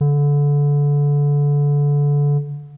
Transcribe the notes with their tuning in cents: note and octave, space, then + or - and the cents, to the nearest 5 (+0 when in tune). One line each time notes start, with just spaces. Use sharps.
D3 -25